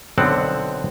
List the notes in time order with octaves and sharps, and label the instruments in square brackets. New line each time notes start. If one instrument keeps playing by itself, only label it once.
[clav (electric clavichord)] B1 D3 B3 C4 F#5 A5